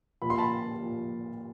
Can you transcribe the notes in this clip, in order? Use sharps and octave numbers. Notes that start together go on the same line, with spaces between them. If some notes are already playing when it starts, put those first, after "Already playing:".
A#2 F3 B5
C6
A5 B5
A#2 F3